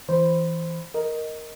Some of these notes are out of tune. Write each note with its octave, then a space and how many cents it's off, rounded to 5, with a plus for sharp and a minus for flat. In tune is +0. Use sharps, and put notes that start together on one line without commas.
E3 +0 C5 +0 B5 +15
A#4 +0 D#5 +0